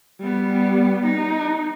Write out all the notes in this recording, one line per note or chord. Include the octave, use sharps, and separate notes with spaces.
G3 B3
D#4